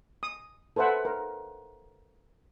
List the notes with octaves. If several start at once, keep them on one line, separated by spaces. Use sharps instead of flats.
D#6
A4 B4 C5 E5 F#5
A#4